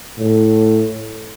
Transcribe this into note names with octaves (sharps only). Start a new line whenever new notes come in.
A2